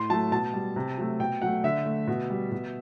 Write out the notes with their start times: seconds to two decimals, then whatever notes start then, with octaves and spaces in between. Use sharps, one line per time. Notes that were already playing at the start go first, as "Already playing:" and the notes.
Already playing: A2 C6
0.10 F#3 A3 A5
0.32 B2 A5
0.53 G3
0.76 C3
0.98 F#3 A3
1.19 B2 G5
1.42 F#3 A3 F#5
1.64 D3 E5
1.86 A3
2.07 B2
2.30 G3
2.52 B2